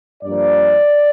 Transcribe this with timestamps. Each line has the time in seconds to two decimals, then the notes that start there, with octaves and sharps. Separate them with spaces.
0.24 G2 F3 A#3 D5